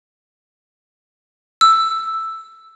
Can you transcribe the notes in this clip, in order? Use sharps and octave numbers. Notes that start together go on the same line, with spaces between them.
E6